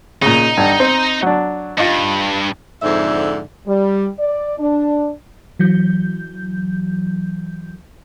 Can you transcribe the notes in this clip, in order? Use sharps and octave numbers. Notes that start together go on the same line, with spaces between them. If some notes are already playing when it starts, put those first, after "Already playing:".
A#2 C#3 D#4
G2 D3
C4 C5
F#3 D4
G2 D#4 F4
F2 G#2 D3 E5
G3
D5
D4
E3 F#3 G6